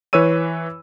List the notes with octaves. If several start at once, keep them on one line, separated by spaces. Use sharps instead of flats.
E3 B4 C#5 E6 D#7